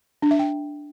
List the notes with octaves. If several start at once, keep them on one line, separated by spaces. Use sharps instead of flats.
D4
E5
G5